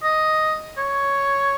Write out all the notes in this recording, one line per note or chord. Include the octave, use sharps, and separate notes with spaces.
D#5
C#5